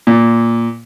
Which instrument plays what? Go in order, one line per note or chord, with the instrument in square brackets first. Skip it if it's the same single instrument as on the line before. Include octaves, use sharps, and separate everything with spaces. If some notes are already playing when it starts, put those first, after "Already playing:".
[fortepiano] A#2